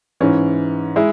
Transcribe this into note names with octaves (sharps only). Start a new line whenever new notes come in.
G#2 E3 C#4
G#3 E4